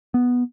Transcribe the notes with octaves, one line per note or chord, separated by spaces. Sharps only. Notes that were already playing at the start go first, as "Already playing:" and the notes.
B3